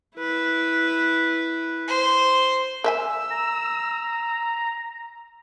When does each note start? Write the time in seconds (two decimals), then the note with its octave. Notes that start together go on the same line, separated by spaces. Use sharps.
0.16 E4 B4
1.88 C5
2.84 A#4 E5 G#5 E6
3.31 A#5